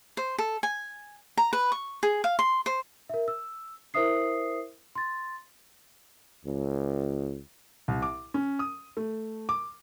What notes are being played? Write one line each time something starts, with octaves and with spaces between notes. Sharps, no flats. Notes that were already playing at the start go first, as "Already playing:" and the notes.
C5
A4
G#5
A#5
B4
C#6
G#4
F5
C6
C5
A#4 E5
E6
E4 A#4 C5 E5 D#6 C7
C6 A6
C#2
C2
D6
C#4
D#6
A3
D6